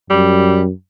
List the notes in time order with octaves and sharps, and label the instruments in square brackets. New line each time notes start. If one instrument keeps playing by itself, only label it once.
[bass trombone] F#2 [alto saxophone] G3